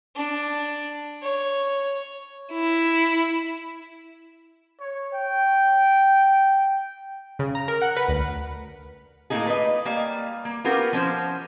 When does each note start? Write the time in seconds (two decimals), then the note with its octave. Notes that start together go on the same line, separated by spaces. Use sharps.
0.16 D4
1.22 C#5
2.52 E4
4.81 C#5
5.13 G5
7.39 C#3
7.55 A#5
7.68 A#4
7.82 F#5
7.97 B4
8.08 D2
9.30 A2 C3 A#3 D#4 G#4
9.46 B4 D#5
9.85 G3 A#3 F5 G#5
10.45 A#3
10.64 B3 C#4 F4 G4 A#4
10.93 F3 C#4 C5